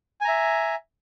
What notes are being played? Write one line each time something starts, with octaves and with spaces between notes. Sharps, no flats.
E5 G#5 A#5